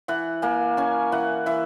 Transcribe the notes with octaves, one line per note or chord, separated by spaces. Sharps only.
E3 F#5
A#3 G#5
C#4 G#5
E3 F#5
E3 E5